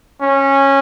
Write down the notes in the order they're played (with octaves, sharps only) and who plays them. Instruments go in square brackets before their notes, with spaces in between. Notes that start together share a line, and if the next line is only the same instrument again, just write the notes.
[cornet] C#4